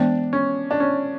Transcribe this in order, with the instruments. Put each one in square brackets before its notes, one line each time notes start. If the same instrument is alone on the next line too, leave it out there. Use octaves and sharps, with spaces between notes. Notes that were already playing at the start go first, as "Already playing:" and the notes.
Already playing: [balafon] E3 G#3 B3 [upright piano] D4
[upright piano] C#4
D4
C#4